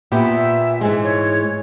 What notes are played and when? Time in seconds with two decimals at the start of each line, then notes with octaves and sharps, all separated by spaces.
0.12 A#2 B3 G4 E5
0.81 G#2 E3 G#3
1.03 C#5